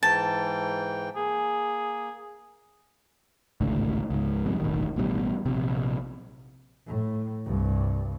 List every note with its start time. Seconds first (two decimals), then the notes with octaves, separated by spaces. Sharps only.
0.03 G#2 E3 G5 A5
1.16 A#3 G#4
3.61 G#1 C#2 A2 D3
4.10 C#2 G#2
4.46 G1 C2 F2 G#2
4.60 E1 A1 D#3
4.96 A1 B2 D#3 G3
5.46 A#1 C3
6.87 A2
7.46 C2 G2